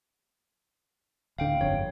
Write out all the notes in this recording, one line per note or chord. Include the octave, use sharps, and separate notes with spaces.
D1 D3 F5 G5
G1 F2 C#5